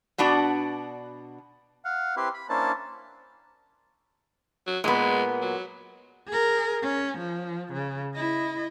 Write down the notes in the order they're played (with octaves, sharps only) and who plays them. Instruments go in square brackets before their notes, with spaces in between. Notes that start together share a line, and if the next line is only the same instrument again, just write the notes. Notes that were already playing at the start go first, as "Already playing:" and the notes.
[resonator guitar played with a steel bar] B2 B3 D4 F#4 D5
[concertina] F5 F#5
C4 E4 G4 B4 C6
B5
A#3 C#4 D4 E4 C5 A5
[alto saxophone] F#3
[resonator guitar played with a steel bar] A#2 B3 [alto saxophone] G#3
[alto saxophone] F#3
[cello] G#4 A#4
C#4
F3
C#3
E4 D#5